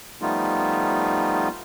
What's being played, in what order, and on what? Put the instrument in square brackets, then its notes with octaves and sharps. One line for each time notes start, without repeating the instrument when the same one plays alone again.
[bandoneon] F3 G3 A3 B3 D#4 F4